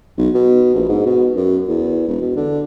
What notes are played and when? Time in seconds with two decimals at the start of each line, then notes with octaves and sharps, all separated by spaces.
0.18 B1
0.34 B2
0.75 A#1
0.89 G#2
1.06 B2
1.36 F#2
1.68 E2
2.08 E1
2.21 B2
2.36 D3